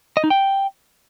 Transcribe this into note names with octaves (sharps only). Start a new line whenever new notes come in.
D#5
D#4
G5